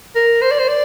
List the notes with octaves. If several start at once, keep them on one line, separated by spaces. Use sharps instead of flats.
A#4
C5
D5
C5
D5